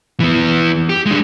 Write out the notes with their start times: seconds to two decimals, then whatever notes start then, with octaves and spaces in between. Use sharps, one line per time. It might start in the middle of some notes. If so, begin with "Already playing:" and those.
0.20 E3 B3
0.89 G4
1.06 G#3 D4